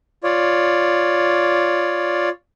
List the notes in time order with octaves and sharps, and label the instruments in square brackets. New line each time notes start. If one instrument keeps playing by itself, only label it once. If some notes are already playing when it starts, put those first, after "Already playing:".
[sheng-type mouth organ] F4 C#5 D5